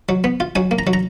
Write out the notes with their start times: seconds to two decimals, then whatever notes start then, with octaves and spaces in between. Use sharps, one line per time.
0.09 F#3
0.24 B3
0.40 F4
0.55 F#3 G#5
0.71 A#3
0.79 A#5
0.87 F#3
0.93 A#5